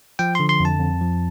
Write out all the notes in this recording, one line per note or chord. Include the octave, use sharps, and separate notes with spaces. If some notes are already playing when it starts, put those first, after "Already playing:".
F3 G5
D3 C6
C6
F2
A5
F2
F3